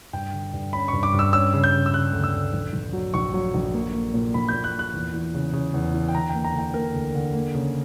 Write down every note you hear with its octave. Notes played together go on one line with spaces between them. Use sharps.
G2 G5
D3
G2
C#4 B5
G2 C#6
D6
G2
E6
C#4 E6
C#3
G6
C#3
E6
C#3 F#6
D2
E6
D2
A#1
A#1
F#3
A#1 C#6
F#3
A#1
A#3
A#3
A#2
A#1 B5
A#2 G6
F#6
A#3
F#6
E2
E3
C#3
C#3
E2
E3
G5
D3 A#5
G5
A#3
A#5
D3 G5
A#3 A#4
D2
D3
A#3
C#3